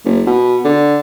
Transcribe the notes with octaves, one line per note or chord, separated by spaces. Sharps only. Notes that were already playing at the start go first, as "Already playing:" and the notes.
F#1
B2
D3